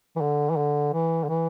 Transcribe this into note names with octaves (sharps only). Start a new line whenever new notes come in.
E3
D3
E3
D3
E3
D3
E3